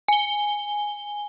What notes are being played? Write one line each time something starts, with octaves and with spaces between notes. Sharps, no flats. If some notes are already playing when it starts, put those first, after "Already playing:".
G#5 G7